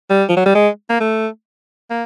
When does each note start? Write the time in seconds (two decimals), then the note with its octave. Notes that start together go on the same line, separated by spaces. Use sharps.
0.10 G3
0.29 F3
0.37 F#3
0.46 G3
0.55 G#3
0.89 A#3
1.00 A3
1.90 A#3